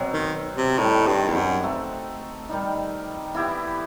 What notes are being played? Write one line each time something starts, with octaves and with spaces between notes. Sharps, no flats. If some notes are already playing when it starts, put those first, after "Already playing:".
Already playing: B2 F#3 C4
D#3
C3
A2 D#3 G3 D#4
G2
E2
F#2
A3 C4 F#4 A4
D#3 G3 D#4
E3 B3 E4 G4